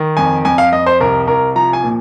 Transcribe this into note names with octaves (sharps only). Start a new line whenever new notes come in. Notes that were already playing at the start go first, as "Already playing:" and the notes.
Already playing: D#3
F2 G#5
F2 G#5
F5
F2 D#5
C5
C2 A#4
C2 A#4
F3 A#5
G#5
A#2